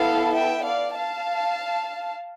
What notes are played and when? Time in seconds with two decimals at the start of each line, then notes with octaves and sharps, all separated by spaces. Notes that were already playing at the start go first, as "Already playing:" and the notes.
Already playing: B3 E4 A4 F5 A5
0.33 E5 G5
0.63 D5 F5
0.94 F5 A5